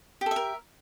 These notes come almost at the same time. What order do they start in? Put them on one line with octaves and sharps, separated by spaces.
G4 A4 E5 A#4